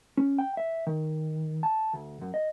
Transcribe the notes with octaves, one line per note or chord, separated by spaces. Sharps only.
C#4
G5
E5
D#3
A5
D2
F#2
D#5